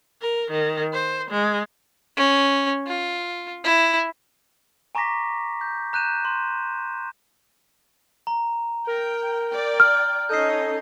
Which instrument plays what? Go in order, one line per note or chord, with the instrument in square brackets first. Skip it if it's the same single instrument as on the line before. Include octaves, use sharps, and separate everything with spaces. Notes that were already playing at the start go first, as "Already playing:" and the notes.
[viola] A#4
D#3
C5
G#3
[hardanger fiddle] C#4
F4
E4
[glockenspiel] G#5 A#5 C#6 D6 A#6 B6
G6
A#5 F#6 G6 D#7 E7
C6
A#5
[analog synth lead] A#4 [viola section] G5
[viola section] D5 G5
[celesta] F6
[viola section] C#4 D#4 D#5 [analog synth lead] A4 [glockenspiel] G6 C7